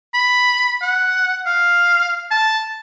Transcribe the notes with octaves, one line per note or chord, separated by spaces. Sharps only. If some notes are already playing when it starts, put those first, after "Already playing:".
B5
F#5
F5
A5